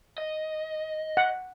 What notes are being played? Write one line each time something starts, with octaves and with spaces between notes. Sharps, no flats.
D#5
F#5